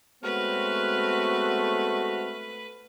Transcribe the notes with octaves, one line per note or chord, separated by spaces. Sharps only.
G#3 A3 B3 C4 F#4 B4 C#5 F6